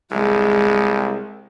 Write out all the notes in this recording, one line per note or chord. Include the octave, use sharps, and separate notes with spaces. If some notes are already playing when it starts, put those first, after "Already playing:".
C2 G#3